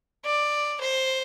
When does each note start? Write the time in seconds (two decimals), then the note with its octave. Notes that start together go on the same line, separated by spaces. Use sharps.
0.25 D5
0.81 C5